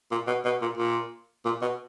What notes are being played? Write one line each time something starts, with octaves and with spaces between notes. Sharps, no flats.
A#2
B2
B2
A#2
A#2
A#2
B2